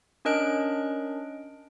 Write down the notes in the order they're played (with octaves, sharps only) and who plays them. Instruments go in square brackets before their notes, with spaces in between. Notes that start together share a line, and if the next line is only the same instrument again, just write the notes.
[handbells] C#4 D4 A#4 D#5 F#6 D7